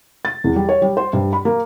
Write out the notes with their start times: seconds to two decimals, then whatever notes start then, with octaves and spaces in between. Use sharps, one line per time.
0.25 A6
0.44 E2
0.56 G3
0.69 C#5
0.82 G3
0.97 C5
1.13 G2
1.33 B5
1.45 A#3